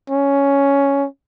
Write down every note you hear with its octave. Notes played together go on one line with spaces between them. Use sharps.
C#4